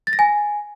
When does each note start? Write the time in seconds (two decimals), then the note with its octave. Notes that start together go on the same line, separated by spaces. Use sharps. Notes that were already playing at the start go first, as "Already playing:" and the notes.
0.07 A6
0.13 A#6
0.19 G#5